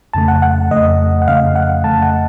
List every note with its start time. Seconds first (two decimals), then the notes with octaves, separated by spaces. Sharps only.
0.13 F2 C#3 A3 A5
0.28 F#5
0.42 F#5
0.71 F2 C#3 A3 D#5
1.22 F#5
1.28 F2 C#3 A3 F5
1.55 F#5
1.84 F2 C#3 A3 A5
2.02 F#5